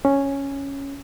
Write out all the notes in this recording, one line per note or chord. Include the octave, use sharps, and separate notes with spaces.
C#4